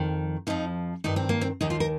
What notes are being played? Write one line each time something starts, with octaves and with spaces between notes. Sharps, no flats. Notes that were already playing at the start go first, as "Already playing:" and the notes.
Already playing: F2 D#3
F2 F3 D#4
G2 D#3 D#4
C4
A#3
C4
D#2 D#3 D#4
F4
A#4